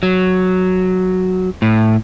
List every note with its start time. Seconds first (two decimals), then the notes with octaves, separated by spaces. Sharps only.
0.03 F#3
1.62 A2